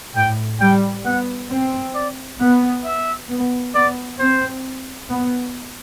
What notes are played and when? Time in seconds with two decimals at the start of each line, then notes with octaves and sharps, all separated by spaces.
0.15 A2 G5
0.60 G3 G5
1.05 B3 F#5
1.50 C4
1.95 D5
2.40 B3 F#5
2.85 E5
3.29 B3
3.74 B3 D5
4.19 C4 C5
5.09 B3